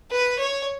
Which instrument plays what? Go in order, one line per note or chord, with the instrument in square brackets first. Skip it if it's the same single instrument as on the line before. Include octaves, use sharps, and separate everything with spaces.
[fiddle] B4
C#5